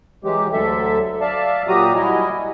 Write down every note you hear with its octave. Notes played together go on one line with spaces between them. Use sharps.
E3 F#3 G#3 G4
D2 D3 F#3 A4 E5
D5 E5 F5 A5
A#2 F#3 F#4 G4 A#5 D#6
G3 E4 F#4 D#5 G#5